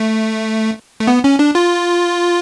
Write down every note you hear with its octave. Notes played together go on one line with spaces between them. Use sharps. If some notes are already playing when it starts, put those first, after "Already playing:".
Already playing: A3
A3
B3
C#4
D4
F4